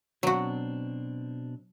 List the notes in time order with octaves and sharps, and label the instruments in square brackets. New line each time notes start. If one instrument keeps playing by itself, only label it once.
[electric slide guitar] B2 C4 D4 [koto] F#3 F#4